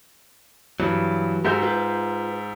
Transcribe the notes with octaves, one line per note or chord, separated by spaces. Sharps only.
G2 E3 F#3
G#2 F#4 G4 A#4 E5 G6
F4 B4